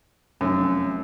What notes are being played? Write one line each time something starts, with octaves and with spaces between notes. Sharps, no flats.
F1 F#2